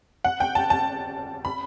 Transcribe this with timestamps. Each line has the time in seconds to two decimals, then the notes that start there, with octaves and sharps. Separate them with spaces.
0.24 F#5
0.40 G5
0.55 A5
0.70 A5
1.45 B5